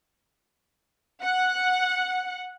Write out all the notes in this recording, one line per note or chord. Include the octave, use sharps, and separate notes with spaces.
F#5